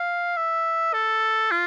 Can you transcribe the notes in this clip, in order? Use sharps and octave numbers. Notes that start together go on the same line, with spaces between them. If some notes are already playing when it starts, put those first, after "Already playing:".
Already playing: F5
E5
A4
F4